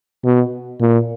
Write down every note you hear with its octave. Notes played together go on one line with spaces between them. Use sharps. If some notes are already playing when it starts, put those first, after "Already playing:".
B2
A#2